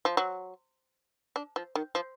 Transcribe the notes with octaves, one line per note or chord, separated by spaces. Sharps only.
F3
F#3
D4
F3
D#3
F3